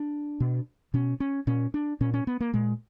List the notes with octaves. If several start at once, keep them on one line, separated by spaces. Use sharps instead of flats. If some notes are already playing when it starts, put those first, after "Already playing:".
Already playing: D4
B2
B2 C#4
C#4
A#2 C#4
D4
A#2 C#4
C#4
B3
A#3
A#2 G#3